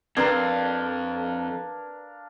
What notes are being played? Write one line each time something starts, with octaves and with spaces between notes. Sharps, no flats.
F2 C4 D4 A#4 B4 F5 A#5 G#6